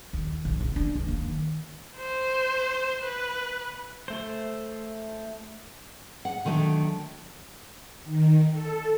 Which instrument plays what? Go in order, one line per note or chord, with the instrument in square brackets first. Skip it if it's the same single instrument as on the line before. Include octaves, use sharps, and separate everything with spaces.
[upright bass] D#2
A#1
C#2
D4
C#2
A#3
D#3
[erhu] C5
B4
[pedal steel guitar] A3 C5
[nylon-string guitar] F#5
D3 D#3 F#3 G#3 A3
[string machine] D#3
A4